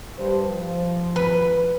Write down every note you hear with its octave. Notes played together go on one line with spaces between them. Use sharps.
G2 C5
F3
B4